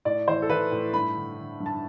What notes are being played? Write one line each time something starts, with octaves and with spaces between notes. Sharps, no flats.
A2 D5
E3 C5
A4
E3 B4
A2
G2 B5
D3
D3
G2
A5